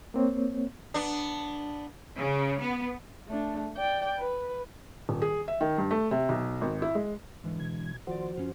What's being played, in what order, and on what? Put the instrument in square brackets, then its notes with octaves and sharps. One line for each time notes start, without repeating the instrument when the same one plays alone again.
[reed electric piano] A#3 C4 C#5
[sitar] B3 D4
[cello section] C#3
B3
[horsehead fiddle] A3 D4
D5 G5
B4
[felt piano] D#1
G#4
E5
D#3
G2
A3
C3
B1
G#1
E4
G#3
[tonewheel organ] G#2 [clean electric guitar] D3 E3 G#3
[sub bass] B2 [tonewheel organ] G#6
[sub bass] G#1 [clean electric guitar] D#2 D5 [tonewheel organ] F3 F#4 C5
[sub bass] F#2 [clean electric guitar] C#4 F4